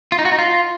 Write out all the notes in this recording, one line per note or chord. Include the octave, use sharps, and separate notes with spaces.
F4
D#4
F#4
D#4
F4